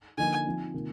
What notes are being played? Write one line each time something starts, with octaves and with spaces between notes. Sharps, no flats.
D3 F3 A#3 D#4 G#5
F3 C4 D#4
C3 D#3 A#3 F4